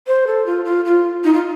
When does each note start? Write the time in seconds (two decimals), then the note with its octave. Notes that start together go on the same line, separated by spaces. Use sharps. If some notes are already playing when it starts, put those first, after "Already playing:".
0.07 C5
0.27 A4
0.46 F4
0.65 F4
0.85 F4
1.24 D#4
1.34 F4